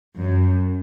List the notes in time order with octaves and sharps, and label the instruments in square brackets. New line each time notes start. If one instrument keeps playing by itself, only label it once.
[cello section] F#2